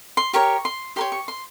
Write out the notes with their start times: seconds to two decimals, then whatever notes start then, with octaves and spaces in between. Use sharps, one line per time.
0.17 C6
0.33 G4 A#4 C#5 C#6
0.65 C6
0.96 G4 A#4 C#5 C6
1.12 C#6
1.28 C6